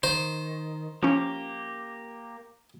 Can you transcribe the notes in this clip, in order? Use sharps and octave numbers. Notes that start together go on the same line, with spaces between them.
D#3 C5
F3 A#3 C#4 G4